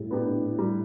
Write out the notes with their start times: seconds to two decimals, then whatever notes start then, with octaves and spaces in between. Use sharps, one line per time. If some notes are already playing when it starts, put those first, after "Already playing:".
Already playing: A2 G3
0.11 B3 D4 G4
0.59 G3